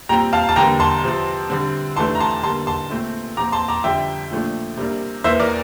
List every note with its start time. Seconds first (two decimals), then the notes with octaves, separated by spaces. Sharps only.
0.09 A#2 G3 C4 G5 A#5
0.33 F5 A5
0.49 A5
0.56 E2 D3 G3 A#3 G5 A#5
0.80 A5 C6
1.03 C3 F3 C4
1.50 D3 G3 C4
1.96 E2 C3 E3 A3 D4 A5 C6
2.15 A#5
2.20 A5 C6
2.43 D3 G3 A#3 A5 C6
2.67 A5 C6
2.90 A#2 A3 C4
3.37 A#2 F3 C4 A#5 D6
3.52 A5 C6
3.68 A#5 D6
3.84 F2 D3 G3 E5 G5
4.31 A#2 F3 A3 D4
4.77 C3 G3 A#3 D4
5.24 E2 E3 A#3 C5 E5
5.40 A#4 D5